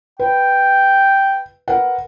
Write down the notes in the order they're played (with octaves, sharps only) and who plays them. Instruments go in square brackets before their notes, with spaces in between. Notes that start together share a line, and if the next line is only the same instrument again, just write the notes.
[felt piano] B4 [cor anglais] G5
[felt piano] A#4 B4 F#5